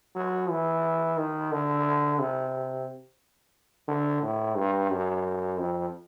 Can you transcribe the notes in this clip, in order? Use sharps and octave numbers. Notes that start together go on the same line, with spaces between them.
F#3
E3
D#3
D3
C3
D3
A2
G2
F#2
F2